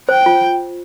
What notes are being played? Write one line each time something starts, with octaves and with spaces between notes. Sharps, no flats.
C5 G5
F4